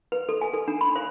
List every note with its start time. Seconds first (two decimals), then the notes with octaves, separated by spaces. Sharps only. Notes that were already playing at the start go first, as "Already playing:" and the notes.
0.12 B4
0.29 A4
0.41 G#5
0.54 A4
0.68 D4
0.81 B5
0.96 C5